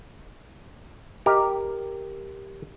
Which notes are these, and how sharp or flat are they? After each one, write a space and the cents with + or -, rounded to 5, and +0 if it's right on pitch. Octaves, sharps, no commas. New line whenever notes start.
G4 +0 A#4 +0 D#5 +0